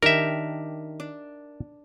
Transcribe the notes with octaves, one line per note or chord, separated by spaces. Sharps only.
D#3 D4 G4 A#4 E5
D4